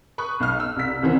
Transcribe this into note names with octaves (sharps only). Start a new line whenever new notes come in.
B5 C#6 D#6 F#6
B1 F6
E6
C2 B6
C2 D#3 E3 C4